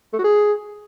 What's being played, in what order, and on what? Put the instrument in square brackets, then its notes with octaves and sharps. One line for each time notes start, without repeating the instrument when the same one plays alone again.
[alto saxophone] A3
F#4
G#4